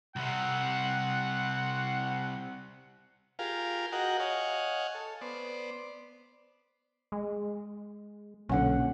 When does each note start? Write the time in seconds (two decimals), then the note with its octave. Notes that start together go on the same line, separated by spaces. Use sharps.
0.16 C2 C3 F#5
3.39 F4 G4 G#4 A#4 F5
3.92 F#4 G#4 A#4 D#5 F#5 G5
4.20 C#5 D#5 F5 F#5 G#5
4.95 A4
5.21 B3 C5 D5
7.12 G#3
8.49 B1 A#2 D3 C#4 F#5